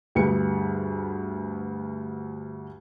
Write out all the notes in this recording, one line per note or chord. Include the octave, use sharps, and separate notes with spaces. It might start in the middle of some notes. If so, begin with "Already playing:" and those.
D2 G2 G#4 B4 C#7